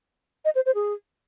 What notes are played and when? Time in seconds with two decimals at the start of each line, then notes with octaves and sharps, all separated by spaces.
0.45 D#5
0.55 C5
0.66 C5
0.75 G#4